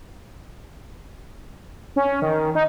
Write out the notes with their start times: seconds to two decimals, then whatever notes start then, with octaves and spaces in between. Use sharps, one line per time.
1.96 C#4
2.22 D#3
2.55 D#4